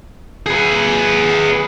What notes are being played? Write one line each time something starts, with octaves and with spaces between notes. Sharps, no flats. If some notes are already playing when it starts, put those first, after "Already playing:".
G#4 B4